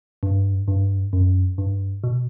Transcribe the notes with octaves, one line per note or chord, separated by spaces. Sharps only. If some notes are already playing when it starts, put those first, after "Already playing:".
G2
G2
F#2
G2
B2